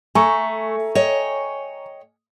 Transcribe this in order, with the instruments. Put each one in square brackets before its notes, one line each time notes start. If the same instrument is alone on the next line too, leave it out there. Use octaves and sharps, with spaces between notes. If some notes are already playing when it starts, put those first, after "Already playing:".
[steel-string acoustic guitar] A3 [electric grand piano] G#5 A#5 C#6
[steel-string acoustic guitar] C#5 D#5 G5